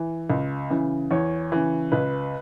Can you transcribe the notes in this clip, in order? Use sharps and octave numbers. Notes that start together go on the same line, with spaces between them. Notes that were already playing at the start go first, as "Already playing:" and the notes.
Already playing: E3
C#2
C#3 E3
E2 C#5
C#3 E3
C#2 B4